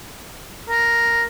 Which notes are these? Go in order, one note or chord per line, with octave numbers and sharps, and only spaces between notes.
A#4